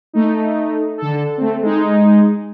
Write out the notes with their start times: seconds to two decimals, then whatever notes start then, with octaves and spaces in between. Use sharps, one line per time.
0.13 A3 D#4
0.97 D3 A4
1.38 A3 C4
1.62 G#3 D#4